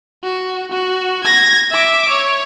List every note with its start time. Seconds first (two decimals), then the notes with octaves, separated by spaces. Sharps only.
0.23 F#4
0.71 F#4
1.24 G#6 A#6
1.71 E5 D6
2.09 C#5